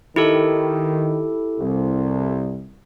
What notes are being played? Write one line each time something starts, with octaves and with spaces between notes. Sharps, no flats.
D#3 E4 G4 A4
C2